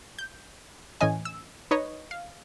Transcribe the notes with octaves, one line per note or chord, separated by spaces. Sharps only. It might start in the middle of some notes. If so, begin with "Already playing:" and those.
G6
A2 E3 C#4 D#5 G#5
E6
D#4 B4 C#5 D#5
F5